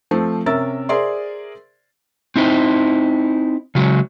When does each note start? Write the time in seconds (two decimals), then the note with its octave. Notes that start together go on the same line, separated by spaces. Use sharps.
0.11 F3 A3 C4
0.46 C3 C#4 A#4 E5 E6 A6
0.89 G#4 A#4 C5 D5 E5 C6
2.36 C4 D#4 E4 C5
3.75 C#3 F#3 G#3